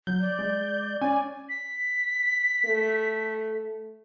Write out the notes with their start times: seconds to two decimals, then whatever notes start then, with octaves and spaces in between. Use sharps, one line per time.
0.07 F#3 G6
0.20 D5
0.39 G#3
1.01 C#4 D5 G#5
1.49 B6
2.65 A3